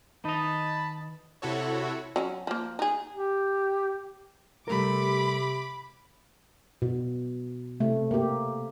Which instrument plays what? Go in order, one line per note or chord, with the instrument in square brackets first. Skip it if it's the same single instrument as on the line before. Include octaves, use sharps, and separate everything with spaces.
[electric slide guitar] D#3 B4 E5 [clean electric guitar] D#4 D#5 [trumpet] A5 [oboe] B5
[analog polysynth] C3 E4 F#4 A4 C#5
[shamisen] F#3 C#4 F#4
F3 A#3
D#4 G#4
[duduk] G4
[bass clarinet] C3 [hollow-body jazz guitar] G3 A3 A#4 [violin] B5 D6
[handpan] B2
C3 A3
A#3 G4